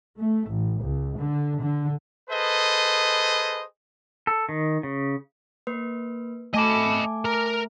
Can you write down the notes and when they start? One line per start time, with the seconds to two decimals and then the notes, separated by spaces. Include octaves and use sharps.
0.18 A3
0.48 A1
0.82 C#2
1.18 D3
1.60 D3
2.30 G#4 A4 B4 C5 D#5
4.27 A4
4.49 D#3
4.83 C#3
5.67 A#3 B4
6.54 A3 D#5 G#5 A5 B5 D6
7.25 A#4 A#5